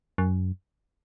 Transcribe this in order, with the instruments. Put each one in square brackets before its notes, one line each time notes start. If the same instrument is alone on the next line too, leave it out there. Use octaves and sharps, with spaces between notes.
[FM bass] F#2